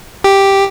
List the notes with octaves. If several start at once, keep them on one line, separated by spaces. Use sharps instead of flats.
G4